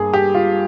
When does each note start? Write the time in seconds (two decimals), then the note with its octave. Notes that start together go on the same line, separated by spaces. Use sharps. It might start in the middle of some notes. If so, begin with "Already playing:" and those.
Already playing: G2 A#3 G#4
0.13 G4
0.35 F4